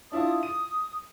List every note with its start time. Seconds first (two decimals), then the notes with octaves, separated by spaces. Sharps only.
0.12 D4 E4 F4 D#6
0.43 D#7